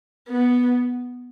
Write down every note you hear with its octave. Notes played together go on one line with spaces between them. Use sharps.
B3